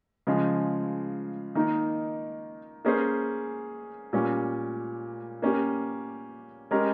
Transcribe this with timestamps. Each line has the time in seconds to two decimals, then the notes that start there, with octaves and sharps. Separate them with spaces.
0.27 C#3 F3 G#3
1.55 D#3 A#3 D#4
2.85 A#3 C#4 G#4 C5
4.13 A#2 G3 C#4
5.42 A#3 C#4 G4
6.71 G#3 C#4 G4 A#4